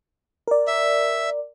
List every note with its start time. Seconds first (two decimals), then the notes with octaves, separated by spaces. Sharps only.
0.48 A#4 D5
0.67 E5